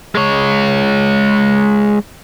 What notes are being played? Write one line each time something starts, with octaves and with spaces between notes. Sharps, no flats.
G#3 C#5